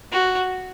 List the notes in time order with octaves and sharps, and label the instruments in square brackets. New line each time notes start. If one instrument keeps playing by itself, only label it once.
[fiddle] F#4